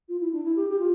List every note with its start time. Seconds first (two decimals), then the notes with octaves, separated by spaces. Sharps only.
0.08 F4
0.20 E4
0.32 D4
0.44 E4
0.56 G4
0.69 G4
0.79 F4